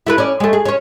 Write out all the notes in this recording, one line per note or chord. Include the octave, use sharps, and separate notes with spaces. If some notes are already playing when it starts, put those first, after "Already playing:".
E4 A4 B4
C#4 D5
G#3 A3
G#4
C#4 C#5